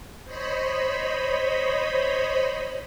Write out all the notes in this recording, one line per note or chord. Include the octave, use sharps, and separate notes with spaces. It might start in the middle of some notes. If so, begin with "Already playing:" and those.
C5 C#5 D#5 B5